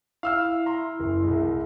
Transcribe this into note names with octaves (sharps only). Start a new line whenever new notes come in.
E4 F5 E6 F6
A#5 C6
F#1 C6
C2 G#3